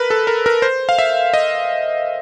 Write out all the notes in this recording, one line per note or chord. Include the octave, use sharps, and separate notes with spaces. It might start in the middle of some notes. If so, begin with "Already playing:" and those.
Already playing: A#4 B4
A4
A#4
A#4
C5
F5
E5
D#5